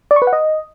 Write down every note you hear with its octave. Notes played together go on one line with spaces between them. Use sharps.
D5
C#6
B4
F#5
D#5